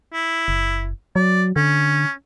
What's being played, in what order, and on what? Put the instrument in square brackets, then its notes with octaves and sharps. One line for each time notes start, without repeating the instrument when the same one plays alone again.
[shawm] E4
[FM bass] F#1
[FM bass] F#3 [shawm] D5
[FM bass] D3 [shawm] C#4